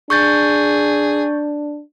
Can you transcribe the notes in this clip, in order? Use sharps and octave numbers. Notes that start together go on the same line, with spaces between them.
D4 G#4 C#6 G6 A6